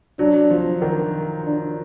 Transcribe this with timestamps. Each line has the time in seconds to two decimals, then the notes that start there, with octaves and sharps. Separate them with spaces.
0.19 F#3 D4
0.50 F3
0.82 D#3
1.45 D4